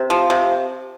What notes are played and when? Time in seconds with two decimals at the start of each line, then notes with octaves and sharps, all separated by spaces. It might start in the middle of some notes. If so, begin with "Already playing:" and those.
Already playing: C3
0.10 F3
0.30 C3